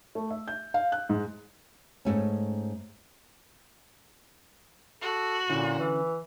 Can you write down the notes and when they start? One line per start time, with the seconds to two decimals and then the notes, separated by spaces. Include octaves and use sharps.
0.15 A3
0.31 E5
0.48 G6
0.74 F5
0.92 F#6
1.09 G#2
2.05 G#2 A3 C#4
5.02 F#4 A4
5.50 A#2 D3 C#4 E4
5.79 E3